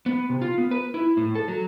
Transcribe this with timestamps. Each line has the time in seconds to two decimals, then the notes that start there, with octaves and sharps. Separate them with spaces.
0.06 B3
0.30 C3
0.42 F4
0.58 B3
0.71 B4
0.94 E4
1.17 A2
1.35 A4
1.48 F#3